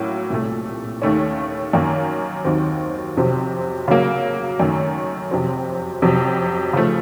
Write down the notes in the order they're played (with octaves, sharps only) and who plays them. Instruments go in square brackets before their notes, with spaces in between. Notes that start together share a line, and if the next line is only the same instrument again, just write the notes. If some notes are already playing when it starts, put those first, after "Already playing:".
Already playing: [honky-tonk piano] A2 F#3 A#3 C#4
C2 A#2 A3
D#2 D#3 A3 C#4
F#2 D#3 A#3
D#2 D#3 F#3 C4 D#4
F2 C3 F#3 C4
C#3 F#3 A#3
F#2 D#3 A3
F2 C3 F#3 C4
F2 C3 F#3
C#3 F3 A3